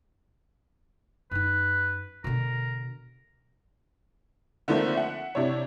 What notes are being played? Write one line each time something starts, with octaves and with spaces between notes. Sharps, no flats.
F#2 D#4 B4
B2 D3 A#4
D3 D#3 F3 A3 A#3 C4
E5 F#5
C3 D4 E4 C#5